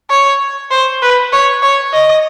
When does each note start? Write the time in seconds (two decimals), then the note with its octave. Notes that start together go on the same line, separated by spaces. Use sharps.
0.10 C#5
0.71 C5
1.02 B4
1.33 C#5
1.62 C#5
1.93 D#5